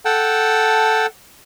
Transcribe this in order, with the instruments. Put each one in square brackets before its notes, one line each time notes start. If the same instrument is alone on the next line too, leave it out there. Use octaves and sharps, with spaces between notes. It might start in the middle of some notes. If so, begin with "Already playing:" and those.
[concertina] A4 F#5 G5 A5